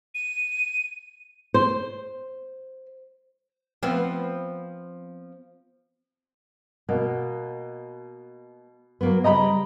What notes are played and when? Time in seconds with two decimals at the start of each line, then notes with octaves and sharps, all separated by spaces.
0.15 D#7
1.54 C5
3.83 F3 B3 C4
6.89 B2 A#3
9.01 F#3 A#3 B3
9.24 C#3 G3 D#5 A#5 B5